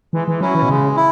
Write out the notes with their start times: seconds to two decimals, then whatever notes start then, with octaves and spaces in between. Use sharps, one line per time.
0.13 E3 G#3
0.28 E3
0.41 F#3 C#4 E4
0.55 E3
0.62 B2
0.68 C#3 G#3
0.96 E4